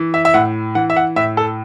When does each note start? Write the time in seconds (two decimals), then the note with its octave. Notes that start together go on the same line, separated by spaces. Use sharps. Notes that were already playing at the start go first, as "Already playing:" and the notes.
Already playing: E3
0.14 E5
0.25 E5
0.34 A2 F#5
0.75 E3 F#5
0.90 E5
0.97 F#5
1.16 A2 E5
1.37 A4